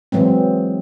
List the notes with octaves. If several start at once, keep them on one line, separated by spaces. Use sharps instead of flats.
E3 F#3 G#3 C4